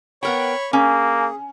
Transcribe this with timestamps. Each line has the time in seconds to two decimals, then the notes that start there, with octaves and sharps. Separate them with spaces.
0.23 B3 A#4 C#5 G5 B5 C#6
0.73 A#3 C#4 G#4